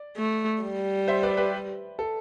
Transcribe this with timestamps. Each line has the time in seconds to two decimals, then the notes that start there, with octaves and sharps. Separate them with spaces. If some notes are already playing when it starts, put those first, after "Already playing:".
Already playing: D5
0.17 A3
0.63 G3
1.08 C5 E5
1.23 B4 D5
1.37 G4 B4
1.99 A4